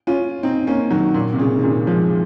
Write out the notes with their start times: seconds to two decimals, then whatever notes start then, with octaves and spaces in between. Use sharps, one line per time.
0.07 C#4 F4
0.43 C4 D#4
0.67 A#3 C#4
0.90 D#3 F#3
1.14 A#2
1.33 C3
1.39 A#2 C#3
1.58 D#3
1.63 A#2 C#3
1.87 F3 G#3